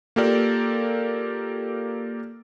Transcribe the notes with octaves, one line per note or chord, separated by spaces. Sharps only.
A#3 F4 G4 A4 A#4 D5